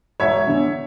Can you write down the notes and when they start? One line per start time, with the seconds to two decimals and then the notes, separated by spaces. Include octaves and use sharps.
0.20 E1 C#5 E5
0.47 E2 D3